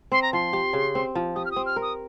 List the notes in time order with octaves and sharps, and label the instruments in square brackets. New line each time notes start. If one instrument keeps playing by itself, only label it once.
[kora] C4 [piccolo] C6
[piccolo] A#5
[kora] F3 [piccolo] C6
[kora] G4
C#3
C4
F3
[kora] G4 [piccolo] D#6
[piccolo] F6
D#6
[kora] C4
[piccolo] F6
[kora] A#4
[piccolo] D#6